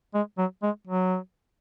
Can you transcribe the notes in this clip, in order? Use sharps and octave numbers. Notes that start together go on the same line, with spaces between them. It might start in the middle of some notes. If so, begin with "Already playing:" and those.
G#3
F#3
G#3
F#3